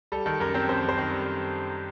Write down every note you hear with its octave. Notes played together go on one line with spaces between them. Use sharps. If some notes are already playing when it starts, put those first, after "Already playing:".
G3 A4
D#3 A4
F#2 A#4
C4 C5
F#2 C5
F#2
C5
D#3
G3